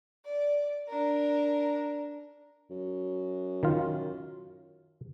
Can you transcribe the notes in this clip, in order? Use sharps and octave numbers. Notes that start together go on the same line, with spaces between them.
D5
D4 A#4
F#2
D#3 F4